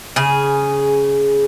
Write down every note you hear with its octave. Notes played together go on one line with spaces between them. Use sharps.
C#3 G#4